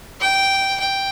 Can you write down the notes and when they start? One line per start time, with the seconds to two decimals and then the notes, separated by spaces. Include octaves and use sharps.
0.20 G5
0.80 G5